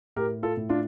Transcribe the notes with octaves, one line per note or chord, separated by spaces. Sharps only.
A2 G4 A#4
F4 A4
A2
D4 F4